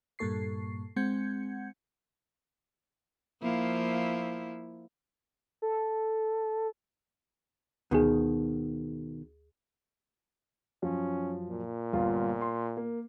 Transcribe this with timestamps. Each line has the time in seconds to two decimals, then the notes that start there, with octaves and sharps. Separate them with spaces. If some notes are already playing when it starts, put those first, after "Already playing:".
0.19 G2 A#2 A#3 A4 C#6 C7
0.96 G#3 C4 F#5 G6 G#6 C#7
3.42 F3 A#3 E4
5.62 A4
7.91 D2 B2 D#3 G#4
10.82 F#2 F3 C#4
11.49 A#2
11.93 G1 F4
12.41 C6
12.77 A#3